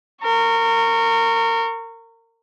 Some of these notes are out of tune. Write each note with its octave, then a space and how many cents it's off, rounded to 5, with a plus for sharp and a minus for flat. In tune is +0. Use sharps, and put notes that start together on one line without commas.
A#4 -25 C#6 -5